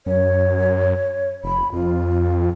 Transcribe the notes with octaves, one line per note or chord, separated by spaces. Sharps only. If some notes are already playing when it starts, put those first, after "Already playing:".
F#2 C#5
F1 B5
F2 F4